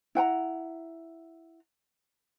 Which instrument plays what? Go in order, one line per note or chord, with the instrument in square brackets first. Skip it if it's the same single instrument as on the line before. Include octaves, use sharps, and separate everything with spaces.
[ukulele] E4 F#5 G5 A#5